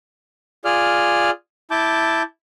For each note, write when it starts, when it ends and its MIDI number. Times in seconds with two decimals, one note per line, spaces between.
0.65 1.30 65
0.65 1.30 68
0.65 1.30 74
0.65 1.30 89
1.71 2.22 64
1.71 2.22 81
1.71 2.22 86
1.71 2.22 91